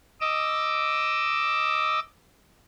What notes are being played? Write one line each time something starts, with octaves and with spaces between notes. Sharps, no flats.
D#5 D6 E6